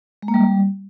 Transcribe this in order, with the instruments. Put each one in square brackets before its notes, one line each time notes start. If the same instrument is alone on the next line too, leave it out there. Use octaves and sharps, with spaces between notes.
[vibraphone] G#3
A#3
G3